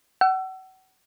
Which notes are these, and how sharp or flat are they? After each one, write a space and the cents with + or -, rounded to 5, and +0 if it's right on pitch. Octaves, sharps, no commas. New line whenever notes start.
F#5 +35 E6 +25